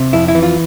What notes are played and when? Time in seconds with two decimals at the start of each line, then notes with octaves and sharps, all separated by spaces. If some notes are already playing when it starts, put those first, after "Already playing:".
Already playing: C3
0.13 F2 E4
0.28 E4
0.35 E3
0.43 F4